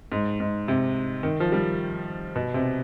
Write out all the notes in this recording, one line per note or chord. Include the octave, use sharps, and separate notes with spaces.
G#2
G#2
C3
D#3
F3
G3
B2
C3